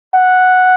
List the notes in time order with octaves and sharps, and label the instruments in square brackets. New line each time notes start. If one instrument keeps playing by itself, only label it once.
[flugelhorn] F#5